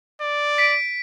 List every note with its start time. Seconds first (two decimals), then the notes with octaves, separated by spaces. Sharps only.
0.21 D5
0.58 B6 D7